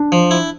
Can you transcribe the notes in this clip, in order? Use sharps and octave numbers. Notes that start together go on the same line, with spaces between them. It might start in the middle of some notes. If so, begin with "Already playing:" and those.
Already playing: D4
F3
E4